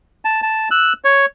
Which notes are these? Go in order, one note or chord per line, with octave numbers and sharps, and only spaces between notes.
A5
A5
E6 F#6
C#5